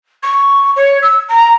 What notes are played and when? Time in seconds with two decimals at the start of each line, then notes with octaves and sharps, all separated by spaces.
0.23 C#6
0.76 C#5
1.02 E6
1.28 A#5